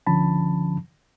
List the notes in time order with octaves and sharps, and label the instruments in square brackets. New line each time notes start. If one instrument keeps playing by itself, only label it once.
[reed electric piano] C#2 D3 F3 C#4 A5 B5